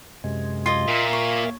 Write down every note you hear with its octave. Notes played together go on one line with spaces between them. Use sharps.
F#2 C3 G#3
F4 D#5
A#2 A#4 E5 F5
C#5